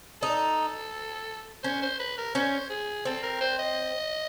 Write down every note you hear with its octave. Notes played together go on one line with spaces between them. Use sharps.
D#4 A4
C#4 C5
C5
B4
A#4
C#4 C5
G#4
C4 A4
A#4
C5
D#5